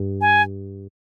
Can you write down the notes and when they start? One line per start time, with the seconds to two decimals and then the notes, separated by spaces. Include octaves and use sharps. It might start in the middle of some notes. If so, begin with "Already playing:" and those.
Already playing: G2
0.21 G#5